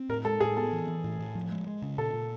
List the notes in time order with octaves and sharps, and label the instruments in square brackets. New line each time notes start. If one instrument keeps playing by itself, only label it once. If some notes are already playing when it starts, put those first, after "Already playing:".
Already playing: [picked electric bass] C4
[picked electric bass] A2 [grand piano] A#4
[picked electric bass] G#3 [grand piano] A4
[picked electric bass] A2 [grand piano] G#4
[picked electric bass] B3 [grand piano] A4
[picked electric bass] E3
E3
A2
A2
F3
G#3
G#3
C#3
[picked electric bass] A#2 [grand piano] A4
[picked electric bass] A#2